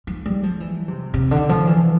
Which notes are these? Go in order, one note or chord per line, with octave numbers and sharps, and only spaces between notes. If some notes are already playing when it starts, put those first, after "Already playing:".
F3
G3
F3
E3
C3
C3
D3
F3
E3